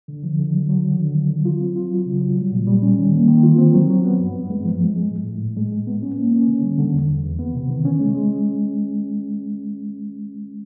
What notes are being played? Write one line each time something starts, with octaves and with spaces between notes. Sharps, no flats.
D3
F3
D3
F#3
F#3
D#3
D3
F#3
F#3
F4
C4
F4
F#3
C#3
F#3
G3
A#2
G3
C#4
D#3
A#3
D#3
F4
C4
F#3
F#3
B3
G2
G2
G#3
F3
G#3
G#3
A2
A2
A2
G#3
G#3
B3
C#4
A#3
C#4
D3
G3
D3
E2
E2
E2
B3
C3
D#3
C#4
G#3
G#3